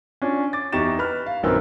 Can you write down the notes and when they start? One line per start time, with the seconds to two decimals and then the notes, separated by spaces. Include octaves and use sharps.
0.22 C#4 D4 F4
0.53 D6 A6
0.72 E2 D#4 G4 C#6 A6 E7
0.99 B4 B5 F6
1.26 F5
1.43 A#1 F#2 D#3 C4 B4 E6